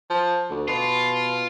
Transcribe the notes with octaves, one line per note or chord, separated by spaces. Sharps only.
F3
D2
B2 F4